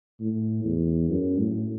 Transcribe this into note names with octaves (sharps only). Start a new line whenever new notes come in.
A2
E2
F#2
A2